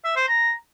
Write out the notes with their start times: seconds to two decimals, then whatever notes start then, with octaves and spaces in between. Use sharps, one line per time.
0.04 E5
0.16 C5
0.28 A#5